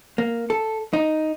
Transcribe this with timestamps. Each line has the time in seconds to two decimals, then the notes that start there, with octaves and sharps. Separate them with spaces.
0.18 A#3
0.50 A4
0.93 D#4